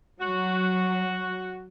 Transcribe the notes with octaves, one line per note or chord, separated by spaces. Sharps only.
F#3 F#4